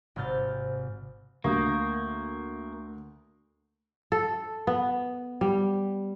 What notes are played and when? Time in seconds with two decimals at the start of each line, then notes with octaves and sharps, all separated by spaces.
0.16 G#1 C3 G#4 F6 G6 A6
1.44 D2 A#3 C#6 D#6 G6
4.12 A4
4.67 B3
5.41 G3